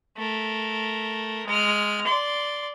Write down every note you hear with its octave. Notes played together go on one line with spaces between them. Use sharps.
A3 A#4
G#3 F6
D5 C6